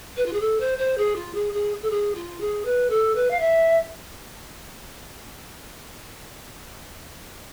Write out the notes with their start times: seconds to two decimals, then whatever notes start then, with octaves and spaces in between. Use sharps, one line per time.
0.17 B4
0.26 F4
0.33 G#4
0.41 A4
0.60 C5
0.78 C5
0.98 G#4
1.16 F4
1.34 G#4
1.54 G#4
1.83 A4
1.90 G#4
2.15 F4
2.41 G#4
2.65 B4
2.90 A4
3.15 B4
3.31 F5
3.40 E5